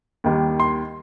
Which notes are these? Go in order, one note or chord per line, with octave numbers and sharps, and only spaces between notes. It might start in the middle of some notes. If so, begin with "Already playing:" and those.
D#2 D#3 G3
C6